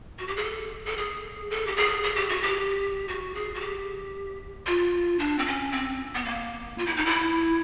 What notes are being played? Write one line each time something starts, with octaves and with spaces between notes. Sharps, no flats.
F#4
G4
G#4
A4
A4
G#4
A4
G4
G#4
G#4
G4
F#4
G4
F#4
G#4
F#4
G4
F4
D4
C4
C#4
C4
B3
A#3
F4
E4
D#4
E4